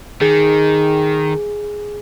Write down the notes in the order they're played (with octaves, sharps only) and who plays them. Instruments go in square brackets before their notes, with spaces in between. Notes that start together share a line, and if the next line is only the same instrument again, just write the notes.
[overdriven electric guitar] D#3 [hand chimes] G#4